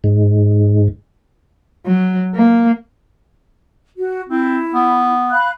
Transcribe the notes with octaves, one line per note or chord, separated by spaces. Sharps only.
G#2
F#3
A#3
F#4
C4 E4
B3
F5 B5 F#6